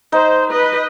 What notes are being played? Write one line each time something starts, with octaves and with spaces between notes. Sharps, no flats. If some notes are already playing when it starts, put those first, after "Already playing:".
D#4 C5
B4 D#5